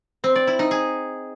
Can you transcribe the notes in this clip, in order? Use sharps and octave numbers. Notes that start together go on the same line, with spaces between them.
C4
D5
E4
D#4
G#4